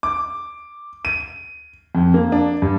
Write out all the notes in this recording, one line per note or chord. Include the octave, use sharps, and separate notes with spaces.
D6
D#7
F2
A#3
D4
G2